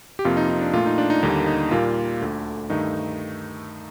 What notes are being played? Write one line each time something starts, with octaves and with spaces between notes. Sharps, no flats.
G4
F2 C3 F3 A#3 F4
D#4
D#4
D4
A#2 A3 F4
D#4
D4
D#4
D#2 D3 G3 A#3 D#4
D#4
A#2 G3 A#3 F4
D2 D3 A3
G2 D#3 A3 D#4